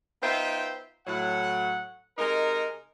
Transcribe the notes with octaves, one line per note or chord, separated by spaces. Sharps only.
B3 D#4 F4 C5 E5 G5
A2 F#3 F#5
C3 G#3 D#4 A#4